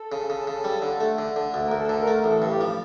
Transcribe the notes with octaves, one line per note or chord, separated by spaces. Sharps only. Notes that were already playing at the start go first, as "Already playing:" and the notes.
Already playing: A4
C#3
C#3
C#3
G3
D3
A3
D3
D3
D2
A#4
D2
A4
D3
A#4
A3
A#4
A1 A4
G2
G4
F3